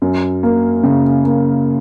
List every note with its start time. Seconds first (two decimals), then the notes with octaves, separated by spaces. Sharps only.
0.02 F#2
0.43 A#3
0.83 C#3
1.24 A#3